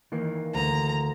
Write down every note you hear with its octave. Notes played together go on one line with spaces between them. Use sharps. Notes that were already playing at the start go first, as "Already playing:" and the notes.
D#3 E3 A#3
D2 A#5